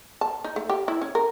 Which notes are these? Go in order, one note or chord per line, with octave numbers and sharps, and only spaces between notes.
A5
D#4
A3
G4
E4
C#4
A#4